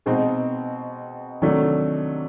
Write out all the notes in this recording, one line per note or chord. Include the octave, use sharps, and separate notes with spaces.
B2 G#3 C4 D#4
C3 D#3 F#3 A3 D4